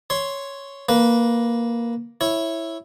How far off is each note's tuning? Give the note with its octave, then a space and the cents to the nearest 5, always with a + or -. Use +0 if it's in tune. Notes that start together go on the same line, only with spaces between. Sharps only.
C#5 +0 C6 +0
A#3 +0 B4 -10
E4 +0 C#5 -15